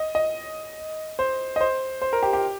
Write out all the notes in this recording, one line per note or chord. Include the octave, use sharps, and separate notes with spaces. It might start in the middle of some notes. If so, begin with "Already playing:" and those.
Already playing: D#5
D#5
C5
D#5
C5
C5
A#4
G4
G4